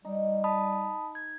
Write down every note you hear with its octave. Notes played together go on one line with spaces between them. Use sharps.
G3 D#4
A5 B5 D#6
G#6